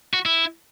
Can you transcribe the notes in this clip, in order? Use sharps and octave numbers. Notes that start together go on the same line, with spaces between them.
F#4
E4